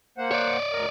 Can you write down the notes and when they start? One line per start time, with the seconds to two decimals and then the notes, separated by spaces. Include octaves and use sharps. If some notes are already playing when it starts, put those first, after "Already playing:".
0.18 A#3 C5 F#5
0.31 C#5 D5
0.73 D2 A#4